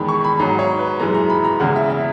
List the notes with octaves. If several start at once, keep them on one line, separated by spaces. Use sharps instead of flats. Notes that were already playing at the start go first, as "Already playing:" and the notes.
Already playing: E2 D#3 G#3 B5
C#6
B5
G#2 F#3 A#5
C#5
B4
F#2 E3 G#3 A#5
A#5
B5
A#5
E2 C#3 G#3 F#5
E5
E5